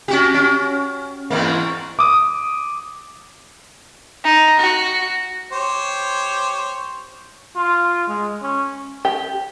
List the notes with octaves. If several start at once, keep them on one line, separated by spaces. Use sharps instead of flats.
C#4 F#4 G4
C#4
E2 G#2 A#3
D6 D#6
D#4
F#4
G4 C5 C#5
F4
G#3
C#4
G4